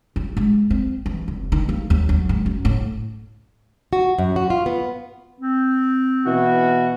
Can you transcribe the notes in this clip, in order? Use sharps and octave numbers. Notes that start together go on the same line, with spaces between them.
F4
G#3
C4
E3
F1
D#3
A#3
D#2
F#3
G#2
F#2
A2
F#4
F#2
F#4
F4
B3
C4
B2 E3 F#4